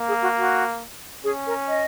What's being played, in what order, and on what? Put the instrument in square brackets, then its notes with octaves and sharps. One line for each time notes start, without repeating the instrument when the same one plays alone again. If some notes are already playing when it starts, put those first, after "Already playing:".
Already playing: [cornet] A#3
[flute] G#4
F#4
F#4
[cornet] C#4 [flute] G#4
[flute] A#4
D#5